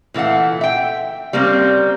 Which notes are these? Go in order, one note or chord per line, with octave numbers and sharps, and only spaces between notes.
A#2 E3 A3 F5 F#5
E5 G5
G3 A#3 C4 C#4